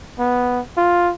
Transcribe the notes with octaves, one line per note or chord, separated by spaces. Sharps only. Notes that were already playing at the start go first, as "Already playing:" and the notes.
B3
F4